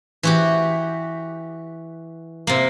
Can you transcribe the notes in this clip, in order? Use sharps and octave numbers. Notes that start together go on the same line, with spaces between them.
E3 F#4 G4
C3 A#3